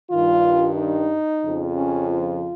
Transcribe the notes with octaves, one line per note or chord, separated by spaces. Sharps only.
G2 D#3 F4
D#4
F2 C#3 F3
C#4
F4